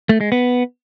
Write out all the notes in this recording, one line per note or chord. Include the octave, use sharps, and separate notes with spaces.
A3
G#3
B3